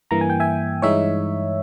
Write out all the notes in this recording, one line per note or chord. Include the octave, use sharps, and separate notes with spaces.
G2 E3 A#3 A#5
G#5
G5
E5 G#5
G2 E3 G#3 D#4 C#5 E5